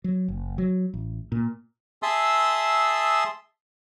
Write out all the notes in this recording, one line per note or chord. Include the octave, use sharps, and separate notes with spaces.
F#3
F#1
F#3
A1
A#2
G#4 E5 A5 C6 D#6 E6